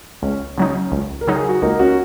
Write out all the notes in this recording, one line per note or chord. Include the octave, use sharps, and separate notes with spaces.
C#2 C#4
C#3 F#3 C#4 D#4
C#4
C#2
A#4
C#3 F#3 D#4
G#4
F#4
C#2 A#3 D#4
C#4 F#4